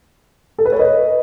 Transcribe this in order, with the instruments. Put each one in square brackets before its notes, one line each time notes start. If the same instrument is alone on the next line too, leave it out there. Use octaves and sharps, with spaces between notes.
[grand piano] A4
B4
C#5
B4 D#5